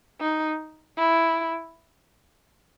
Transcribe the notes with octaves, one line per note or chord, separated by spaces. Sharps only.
D#4
E4